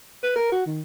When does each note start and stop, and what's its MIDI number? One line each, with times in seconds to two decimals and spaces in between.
0.23 0.33 71
0.36 0.52 70
0.52 0.62 66
0.66 0.82 51